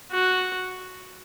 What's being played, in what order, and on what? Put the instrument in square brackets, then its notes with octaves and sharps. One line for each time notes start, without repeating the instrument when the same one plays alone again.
[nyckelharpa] F#4